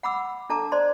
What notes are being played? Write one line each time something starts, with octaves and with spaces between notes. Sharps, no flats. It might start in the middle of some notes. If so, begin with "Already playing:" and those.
F#5 B5 D6 E6
D4 A4 A5 A#5 D6
C5 D5 C6